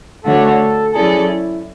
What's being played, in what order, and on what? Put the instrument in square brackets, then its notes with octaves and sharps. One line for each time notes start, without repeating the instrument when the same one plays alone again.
[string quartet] D3 A3 D4 F#4 C#5 [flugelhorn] A4
[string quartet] F#3 C#4 E4 A4 D5 [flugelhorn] G#4
[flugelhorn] E4